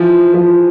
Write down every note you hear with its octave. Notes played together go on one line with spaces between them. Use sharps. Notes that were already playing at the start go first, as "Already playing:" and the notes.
Already playing: E3 F3
F3